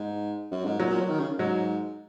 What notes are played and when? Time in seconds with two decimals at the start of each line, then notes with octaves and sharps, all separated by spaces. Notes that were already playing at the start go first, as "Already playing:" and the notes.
Already playing: G#2
0.51 F#2
0.65 G#2
0.80 A#2 F#3
0.90 A#2
1.00 F#3
1.09 D#3
1.20 C#3
1.38 G#2 F#3